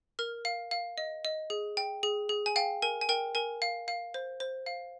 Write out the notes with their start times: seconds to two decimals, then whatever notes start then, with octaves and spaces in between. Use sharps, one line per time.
0.19 A#4 F6
0.45 F5
0.71 F5
0.98 D#5
1.25 D#5
1.50 G#4
1.77 G5
2.03 G#4
2.29 G#4
2.46 G#5
2.56 F5 G5
2.82 A#4 G#5
3.01 G#5
3.09 A#4 G5
3.35 A#4 G#5
3.62 F5
3.88 F5
4.14 C5
4.40 C5
4.66 F5